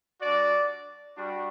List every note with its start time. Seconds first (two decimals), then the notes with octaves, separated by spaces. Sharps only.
0.21 G3 D4 F#4 D5
1.17 G3 D4 F#4